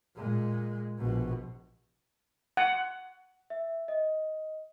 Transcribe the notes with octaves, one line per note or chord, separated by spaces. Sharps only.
A#2 G#3
A#1 B2
F#5
E5
D#5